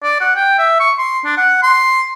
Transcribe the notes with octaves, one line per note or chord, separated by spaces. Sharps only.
D5
F#5
G5
E5
C#6
C6
D4
F#5
C6